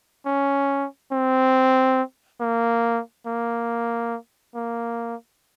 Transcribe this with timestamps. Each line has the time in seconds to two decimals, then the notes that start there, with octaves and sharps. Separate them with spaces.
0.26 C#4
1.12 C4
2.40 A#3
3.27 A#3
4.55 A#3